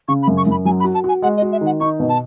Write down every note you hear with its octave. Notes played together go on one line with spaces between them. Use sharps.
C#3 C#6
B5
F#2
C#6
F#2 B5
F#3 G#5
B5
F#4
A5
F#4 G#5
G#3 F#5
D#5
F#4
E5
D#3 F#5
D#4 C#6
B2
A5